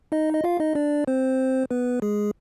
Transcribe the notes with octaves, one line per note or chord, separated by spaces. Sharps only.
D#4 D#5
D#5
F4 F5
D#4 D#5
D4 D5
C4 C5
B3 B4
G#3 G#4